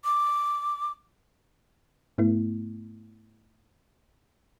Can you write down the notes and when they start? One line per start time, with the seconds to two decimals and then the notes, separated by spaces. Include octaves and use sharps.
0.04 D6
2.18 G#2 A3 B3 E4